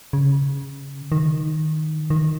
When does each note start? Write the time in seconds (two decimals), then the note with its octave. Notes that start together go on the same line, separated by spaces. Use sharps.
0.13 C#3
1.12 D#3
2.10 D#3